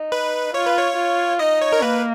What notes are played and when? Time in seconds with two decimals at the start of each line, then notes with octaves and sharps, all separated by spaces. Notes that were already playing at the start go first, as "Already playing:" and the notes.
Already playing: D#4
0.12 B4
0.54 F4 C#5
0.65 B4
0.77 C#5
0.97 F4
1.39 D#4 D#5
1.61 C#5
1.72 A#4
1.82 A#3 B4